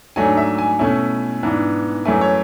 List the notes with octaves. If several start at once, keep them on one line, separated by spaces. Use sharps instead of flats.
G#2 F#3 A3 D4 G#5
E5
G#5
B2 A3 C#4 E4
G#2 E3 B3 D4
F#2 E3 A3 E4 G#5
C#5